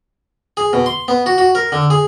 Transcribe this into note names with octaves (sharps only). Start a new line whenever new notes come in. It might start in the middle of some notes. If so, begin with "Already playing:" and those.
G#4
B2
C6
B3
F#4
F#4
A#4
D3
G#4